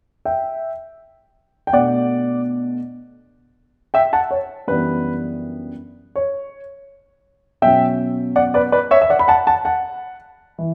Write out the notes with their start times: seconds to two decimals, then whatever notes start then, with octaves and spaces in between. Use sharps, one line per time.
0.25 E5 G5
1.67 G5
1.73 B2 A3 D4 D5 F#5
3.94 E5 G5
4.13 F#5 A5
4.31 C#5
4.68 F#2 E3 G3 B3 D4 B4
6.16 C#5
7.62 B2 F#3 C#4 E5 G5
8.36 D5 F#5
8.54 B4 D5
8.72 B4 D5
8.91 C#5 E5
9.02 E5
9.10 D5 F#5
9.19 B5
9.28 F#5 A5
9.47 F#5 A5
9.65 F#5 A5
10.58 E3